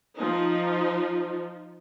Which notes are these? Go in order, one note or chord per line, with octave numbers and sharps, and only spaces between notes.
F3 D#4